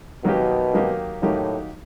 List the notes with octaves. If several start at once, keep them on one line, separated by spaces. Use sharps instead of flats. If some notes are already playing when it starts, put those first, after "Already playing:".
B2 D#3 F#3 A#3 D#4 G4
D#3 F#3 A#3 D#4 G4
A2 D#3 F#3 A#3 D#4 G4